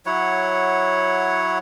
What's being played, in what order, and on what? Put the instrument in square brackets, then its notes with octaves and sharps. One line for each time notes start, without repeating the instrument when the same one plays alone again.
[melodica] F#3 E4 C#5 F#5